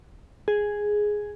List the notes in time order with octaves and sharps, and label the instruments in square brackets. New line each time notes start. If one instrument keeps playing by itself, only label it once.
[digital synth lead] G#4